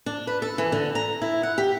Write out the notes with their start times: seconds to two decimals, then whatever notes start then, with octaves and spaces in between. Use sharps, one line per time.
0.06 D4
0.27 B4
0.42 A4
0.58 E3
0.72 D3
0.95 A#5
1.22 E4
1.43 F#5
1.58 G4